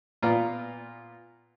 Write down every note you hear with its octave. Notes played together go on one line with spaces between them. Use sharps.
A#2 B3 F4 D5 A#5 F6